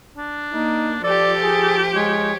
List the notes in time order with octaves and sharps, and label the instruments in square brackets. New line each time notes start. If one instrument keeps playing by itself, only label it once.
[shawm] D4
[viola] A#3 [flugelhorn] D#4
[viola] F3 G4 [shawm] A4 [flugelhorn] D5
[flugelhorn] G#4
[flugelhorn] G#3 [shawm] C#5